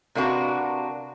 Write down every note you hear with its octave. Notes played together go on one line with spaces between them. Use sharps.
C3 A#3 D4 F#4 B4